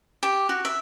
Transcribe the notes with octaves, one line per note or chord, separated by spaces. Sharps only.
G4
F#4
E5